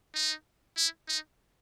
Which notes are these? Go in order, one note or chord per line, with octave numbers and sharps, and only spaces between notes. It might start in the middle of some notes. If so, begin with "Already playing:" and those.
D#4
E4
D#4